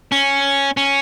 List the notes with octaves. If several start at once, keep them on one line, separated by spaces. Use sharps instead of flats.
C#4
C#4